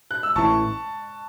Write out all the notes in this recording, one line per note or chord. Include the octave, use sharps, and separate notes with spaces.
F#6
E6
A1 A2 E3 A5 C#6